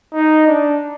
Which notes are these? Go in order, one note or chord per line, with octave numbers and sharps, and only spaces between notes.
D#4
D4